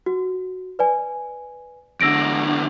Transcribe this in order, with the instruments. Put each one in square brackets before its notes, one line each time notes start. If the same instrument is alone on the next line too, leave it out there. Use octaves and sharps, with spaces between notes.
[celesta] F#4
B4 D5 G#5
[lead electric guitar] E2 D3 [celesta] E6 A#6 D7